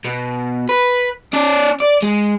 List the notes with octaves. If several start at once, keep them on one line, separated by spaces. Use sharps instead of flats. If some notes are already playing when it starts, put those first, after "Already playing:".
B2
B4
C#4 D5
D5
G#3